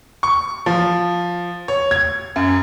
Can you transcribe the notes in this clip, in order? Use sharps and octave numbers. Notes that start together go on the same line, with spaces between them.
C#6
F3
C#5
G#6
F#2